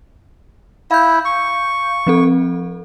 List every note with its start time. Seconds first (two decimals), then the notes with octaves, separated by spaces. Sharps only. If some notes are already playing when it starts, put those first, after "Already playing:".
0.91 E4 F5 G6
1.25 C#6
2.07 F3 C4 A4